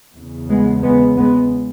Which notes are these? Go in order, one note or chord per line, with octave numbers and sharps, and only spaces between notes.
E2 C#3
G#3 B3
G#3 B3
G#3 B3